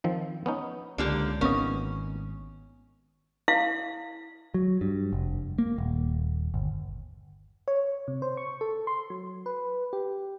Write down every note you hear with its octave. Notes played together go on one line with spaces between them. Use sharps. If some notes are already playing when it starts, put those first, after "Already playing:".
D#3 F3 C4
B3 C#4 D#4
C#2 D3 A#3 G4
G#1 A#3 B3 C#4 D#5
E4 F5
F#3
G2
F1
A#3
D#1
G1
C#5
C3
C5
C#6
A4
C6
F#3
B4
G4